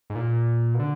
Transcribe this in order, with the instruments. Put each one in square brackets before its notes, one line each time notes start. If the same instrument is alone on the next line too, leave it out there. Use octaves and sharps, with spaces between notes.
[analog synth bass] G#2
A#2
B2
D3